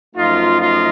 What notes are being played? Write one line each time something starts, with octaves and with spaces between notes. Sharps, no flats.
F#2 F3 A3 D#4 F4
F4